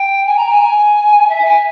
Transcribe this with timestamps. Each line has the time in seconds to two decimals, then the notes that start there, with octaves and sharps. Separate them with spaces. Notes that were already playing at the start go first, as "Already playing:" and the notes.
Already playing: G5
0.26 G#5
0.37 A#5
0.49 G#5
0.60 G#5
1.29 E5
1.45 G#5